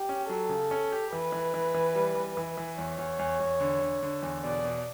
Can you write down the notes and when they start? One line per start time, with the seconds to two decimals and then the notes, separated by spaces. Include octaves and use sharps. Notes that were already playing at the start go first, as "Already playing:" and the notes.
Already playing: G4
0.09 C#4
0.29 F#3 A4
0.49 C#3
0.71 C#4
0.92 G4
1.12 E3 B4
1.32 E3
1.54 E3
1.74 E3
1.95 G3
2.15 E3
2.37 E3
2.57 E3
2.78 E2 C#5
2.98 E2
3.19 E2
3.40 E2
3.60 D3
3.82 D3
4.03 D3
4.22 E2
4.44 B2 D5
4.64 B2